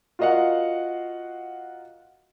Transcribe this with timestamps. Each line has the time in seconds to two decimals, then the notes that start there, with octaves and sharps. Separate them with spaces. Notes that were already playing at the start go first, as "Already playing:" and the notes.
0.19 F4 F#4 A#4 D#5 F5 F#5